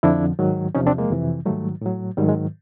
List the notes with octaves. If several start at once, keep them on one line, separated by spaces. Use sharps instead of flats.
F2 D3 F3 D4 E4
G#2 D#3 F#3
E2 C3 F3 C#4 D#4
C4 D4
G#3 A#3
F2 C3 E3
G#2 D#3 F#3 G3 A3
A2 F#3
G#2 D#3 F#3 G3
G#3